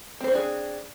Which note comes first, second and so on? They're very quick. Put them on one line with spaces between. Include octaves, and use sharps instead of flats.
C4 C5 F#4 D4 G#4